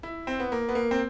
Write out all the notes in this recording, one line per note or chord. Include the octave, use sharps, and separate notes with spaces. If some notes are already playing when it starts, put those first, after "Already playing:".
E4
C4
B3
A#3
B3
A#3
C4